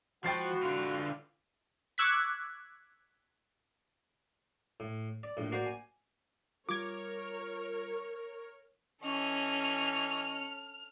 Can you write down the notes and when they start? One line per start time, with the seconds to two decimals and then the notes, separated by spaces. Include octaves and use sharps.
0.24 F3 G#3 E4 F#4 G5 A6 C7
0.63 D3 F4
1.98 C#6 D6 E6 F#6 G#6 B6
4.80 A2
5.23 D5
5.37 A#1 A2
5.52 A#3 F#4 C5 D5
5.66 G#5
6.69 G3 F4 A#4 C#5 D6 G#6
9.03 E3 C#4 A4 D#5 C#6 F6